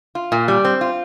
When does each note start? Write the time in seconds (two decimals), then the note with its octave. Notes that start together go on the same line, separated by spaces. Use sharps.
0.15 F4
0.32 A#2
0.48 G3
0.65 C4
0.81 F4